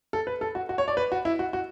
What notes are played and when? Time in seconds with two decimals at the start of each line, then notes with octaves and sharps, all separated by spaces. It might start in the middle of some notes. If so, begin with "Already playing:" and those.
0.13 A4
0.27 B4
0.41 A4
0.55 F#4
0.69 F#4
0.78 C#5
0.88 D5
0.97 B4
1.12 F#4
1.25 E4
1.39 F#4
1.53 F#4